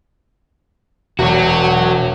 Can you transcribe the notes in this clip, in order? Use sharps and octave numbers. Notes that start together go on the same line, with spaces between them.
E1 F#4 C#5